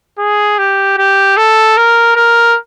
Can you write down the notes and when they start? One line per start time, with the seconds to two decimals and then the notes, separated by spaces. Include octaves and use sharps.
0.19 G#4
0.58 G4
0.97 G4
1.37 A4
1.77 A#4
2.16 A#4